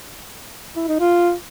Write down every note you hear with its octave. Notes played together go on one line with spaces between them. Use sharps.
E4
D#4
F4